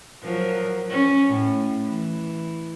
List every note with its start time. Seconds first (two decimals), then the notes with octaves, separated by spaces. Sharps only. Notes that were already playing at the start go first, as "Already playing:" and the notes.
0.23 F3 F#3 A#4
0.90 C#4
1.28 A2
1.86 E3